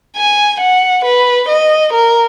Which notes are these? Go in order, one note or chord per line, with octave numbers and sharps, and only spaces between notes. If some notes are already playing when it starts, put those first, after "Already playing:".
G#5
F#5
B4
D#5
A#4